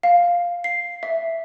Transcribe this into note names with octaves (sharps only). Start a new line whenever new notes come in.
F5
C7
E5